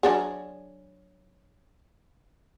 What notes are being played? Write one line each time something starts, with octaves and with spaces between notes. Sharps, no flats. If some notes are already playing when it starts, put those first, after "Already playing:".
F#3 D4 G#4